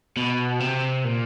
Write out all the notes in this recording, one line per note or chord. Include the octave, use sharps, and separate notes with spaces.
B2
C3
A#2